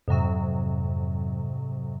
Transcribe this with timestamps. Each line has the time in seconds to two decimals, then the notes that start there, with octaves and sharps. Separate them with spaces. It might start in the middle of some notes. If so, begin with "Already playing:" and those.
0.08 F2 G#2 C3 F#3